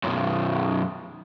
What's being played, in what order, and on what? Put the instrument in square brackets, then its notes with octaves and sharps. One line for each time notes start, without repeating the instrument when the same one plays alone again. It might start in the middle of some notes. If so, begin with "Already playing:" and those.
[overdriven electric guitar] B1 F#2